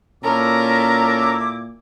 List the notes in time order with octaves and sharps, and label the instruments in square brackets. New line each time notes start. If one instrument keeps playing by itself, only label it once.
[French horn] A#2 [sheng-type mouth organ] C#4 A#5 [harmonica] E4 A4 D6 [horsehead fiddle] A#4